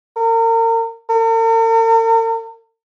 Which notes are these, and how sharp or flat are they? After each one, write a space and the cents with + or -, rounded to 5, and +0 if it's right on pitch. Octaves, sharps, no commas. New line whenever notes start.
A#4 -35
A#4 -45